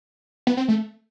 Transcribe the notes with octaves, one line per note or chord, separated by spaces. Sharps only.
B3
C4
A3